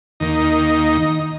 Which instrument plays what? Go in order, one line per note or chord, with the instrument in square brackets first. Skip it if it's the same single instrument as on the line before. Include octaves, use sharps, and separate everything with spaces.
[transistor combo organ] D#2 D#3 A#3 D#4